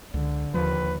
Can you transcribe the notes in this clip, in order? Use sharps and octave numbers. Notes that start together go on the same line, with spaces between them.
C#2 D3
D#2 F3 B4